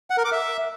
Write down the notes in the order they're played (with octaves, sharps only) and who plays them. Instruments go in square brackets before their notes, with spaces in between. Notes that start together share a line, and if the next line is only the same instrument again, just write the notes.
[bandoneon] F#5
A#4
D6
E5